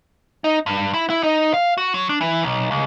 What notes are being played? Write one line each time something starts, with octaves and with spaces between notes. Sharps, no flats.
D#4
G2
E4
E4
D#4
F5
F#4
F#3
D4
E3
B1
C#2